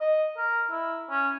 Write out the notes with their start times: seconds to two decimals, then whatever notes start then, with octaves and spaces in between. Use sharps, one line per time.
0.01 D#5
0.37 A#4
0.70 E4
1.11 C#4